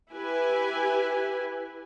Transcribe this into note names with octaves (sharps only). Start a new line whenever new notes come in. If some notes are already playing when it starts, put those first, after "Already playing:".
E4 G4 B4 G#5